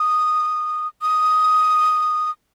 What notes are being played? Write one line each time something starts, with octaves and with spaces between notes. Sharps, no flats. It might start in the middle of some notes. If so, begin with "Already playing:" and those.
Already playing: D#6
D#6